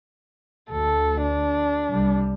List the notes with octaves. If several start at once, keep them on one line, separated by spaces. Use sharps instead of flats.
D2 A4
D4
C2 G3